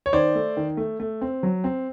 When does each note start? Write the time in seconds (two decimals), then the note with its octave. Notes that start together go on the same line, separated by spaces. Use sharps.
0.06 C#5
0.13 D#3 C5 D5
0.35 A3
0.57 D#3
0.77 A3
1.00 A3
1.21 C4
1.43 F#3
1.64 C4